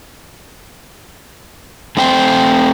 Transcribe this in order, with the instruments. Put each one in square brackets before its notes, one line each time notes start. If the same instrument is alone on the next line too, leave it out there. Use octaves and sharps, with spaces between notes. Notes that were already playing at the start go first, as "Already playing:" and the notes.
[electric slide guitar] A3 C4 C5 G5